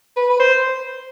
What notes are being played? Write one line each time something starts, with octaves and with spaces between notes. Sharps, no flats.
B4
B4
C5